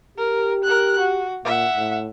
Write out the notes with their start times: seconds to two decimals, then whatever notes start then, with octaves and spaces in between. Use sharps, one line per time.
0.18 G4 A#4
0.64 A#4 F#6
0.98 F#4
1.45 A#2 E5 F#5
1.77 A2